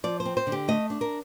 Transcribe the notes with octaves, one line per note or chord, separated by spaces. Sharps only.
F3 D5
C5
C4
C5
D3
G4
A3 D#5
D4
A#4